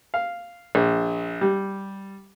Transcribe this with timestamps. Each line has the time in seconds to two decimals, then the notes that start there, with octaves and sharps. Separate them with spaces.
0.14 F5
0.75 A#1
1.41 G3